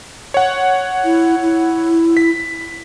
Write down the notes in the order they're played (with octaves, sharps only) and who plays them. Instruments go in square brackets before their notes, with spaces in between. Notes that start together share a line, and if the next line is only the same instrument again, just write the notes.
[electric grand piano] C#5 F#5
[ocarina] E4
E4
[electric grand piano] B6